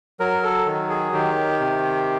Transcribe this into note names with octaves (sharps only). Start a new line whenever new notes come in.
F#3 A#4
A4
D#3
G#4
D#3 G4
C3